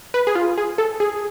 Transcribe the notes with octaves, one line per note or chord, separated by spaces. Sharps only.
B4
G#4
F4
G#4
A4
G#4